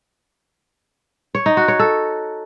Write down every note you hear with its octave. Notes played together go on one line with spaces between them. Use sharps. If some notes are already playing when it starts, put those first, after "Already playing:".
C#5
D#4
F#4
C#5
A4